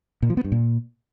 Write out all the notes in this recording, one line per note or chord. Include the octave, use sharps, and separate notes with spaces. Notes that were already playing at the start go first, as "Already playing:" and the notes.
A#2
F3
B3
G2
A#2